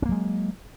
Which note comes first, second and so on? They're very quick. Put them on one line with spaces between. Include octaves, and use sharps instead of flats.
C#4 A#3 F#3 G#3